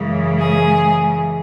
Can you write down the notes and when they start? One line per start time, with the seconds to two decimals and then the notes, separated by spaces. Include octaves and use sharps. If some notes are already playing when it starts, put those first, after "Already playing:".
Already playing: F#2 C#3 E3 G#3
0.39 G#4